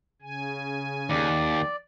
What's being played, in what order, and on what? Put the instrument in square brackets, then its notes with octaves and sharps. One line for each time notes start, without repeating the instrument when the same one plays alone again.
[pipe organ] C#3 G#5
[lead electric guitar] D#2 [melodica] D5